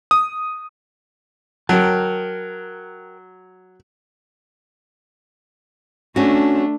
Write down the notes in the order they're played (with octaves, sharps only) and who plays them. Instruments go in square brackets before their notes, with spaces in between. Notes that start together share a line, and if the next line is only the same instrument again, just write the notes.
[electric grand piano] D#6
[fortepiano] F#3 [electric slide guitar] A#4 G5 A5
[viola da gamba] A3 D4 [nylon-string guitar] C#4 F#4